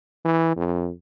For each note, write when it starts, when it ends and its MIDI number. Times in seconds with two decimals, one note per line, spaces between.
0.25 0.53 52
0.57 0.91 41